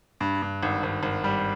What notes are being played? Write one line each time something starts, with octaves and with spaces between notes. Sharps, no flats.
G2
G2
G#1
G#1
G#1
G3